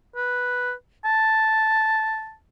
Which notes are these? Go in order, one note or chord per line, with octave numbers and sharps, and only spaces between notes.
B4
A5